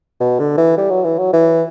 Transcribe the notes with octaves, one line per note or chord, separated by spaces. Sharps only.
B2
D3
E3
G3
F#3
E3
F#3
E3